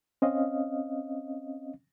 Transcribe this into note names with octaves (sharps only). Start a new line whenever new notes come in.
C4 C#4 D#5 F5